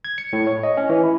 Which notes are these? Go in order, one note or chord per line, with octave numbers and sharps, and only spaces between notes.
G#6
C#7
A2
C#5
D#5
C#4
E3
E4